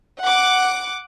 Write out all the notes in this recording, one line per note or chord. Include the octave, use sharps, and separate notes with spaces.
F#5 D6